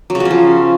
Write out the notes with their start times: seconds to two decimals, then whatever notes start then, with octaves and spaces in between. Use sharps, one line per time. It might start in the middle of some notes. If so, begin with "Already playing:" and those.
0.10 F#3
0.15 C#3
0.20 F#4
0.25 C#4
0.31 F3